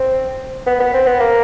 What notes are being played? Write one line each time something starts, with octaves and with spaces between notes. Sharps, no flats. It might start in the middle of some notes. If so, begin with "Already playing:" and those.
Already playing: C4
B3
B3
C4
B3
A#3